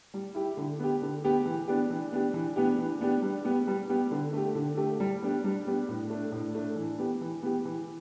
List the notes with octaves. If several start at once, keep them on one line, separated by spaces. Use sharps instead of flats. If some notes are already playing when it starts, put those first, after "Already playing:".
G3
E4 G4
D3
B3 G4
D3
B3 G4
E3
B3 D4 G4
E3
B3 D4 G4
E3
B3 D4 G4
E3
B3 D4 G4
G3
B3 G4
G3
B3 G4
D3
A3 G4
D3
A3 G4
G3
B3 D4 G4
G3
B3 D4 G4
A2
A3 D4
A2
A3 D4
E3
B3 G4
E3
B3 G4
E3